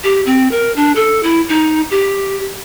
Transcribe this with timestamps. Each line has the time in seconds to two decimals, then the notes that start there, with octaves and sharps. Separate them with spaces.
0.04 G4
0.26 C4
0.51 A#4
0.76 D4
0.95 A4
1.23 E4
1.49 D#4
1.91 G4